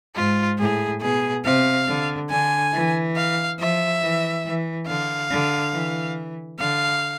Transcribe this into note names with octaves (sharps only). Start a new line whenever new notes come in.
G#2 F4
A2 G#4
B2 G#4
C3 F5
D3
D3 G#5
E3
F5
F3 E5
E3
E3
D3 F5
D3
E3
D3 F5